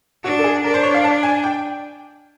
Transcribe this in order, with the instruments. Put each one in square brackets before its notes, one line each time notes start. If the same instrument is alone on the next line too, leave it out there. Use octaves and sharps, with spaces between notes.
[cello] D4 [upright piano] F#4
[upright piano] A4
G#4
[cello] D4 [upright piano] A#4
[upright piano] C5
C#5
F5
A5
G#5
G5